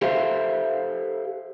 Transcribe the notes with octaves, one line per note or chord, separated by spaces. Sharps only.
G4 A4 B4 C5 E5 F5